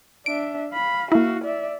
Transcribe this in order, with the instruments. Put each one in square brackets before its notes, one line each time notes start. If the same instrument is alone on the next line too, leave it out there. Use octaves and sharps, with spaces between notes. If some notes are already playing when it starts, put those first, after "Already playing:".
[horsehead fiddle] D4 E5 [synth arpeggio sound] D7
[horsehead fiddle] F5 B5
[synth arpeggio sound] A#3 E4 [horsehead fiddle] F#4 F5
[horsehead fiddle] D5 E5